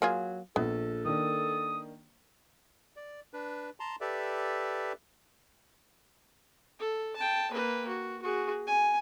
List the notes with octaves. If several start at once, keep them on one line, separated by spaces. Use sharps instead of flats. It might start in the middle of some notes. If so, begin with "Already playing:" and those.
F#3 A#3 F4 G#4
A#1 B3 A4
D#3 A#3 D4 D#6
D5
D4 B4
A5 A#5 C6
G4 A4 B4 D5 E5
A4
G5 A5
A#3 B4
F#4
F#4 G#4
G#5